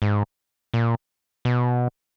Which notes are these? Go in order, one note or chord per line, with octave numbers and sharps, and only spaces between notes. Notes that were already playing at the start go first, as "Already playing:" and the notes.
G#2
A#2
B2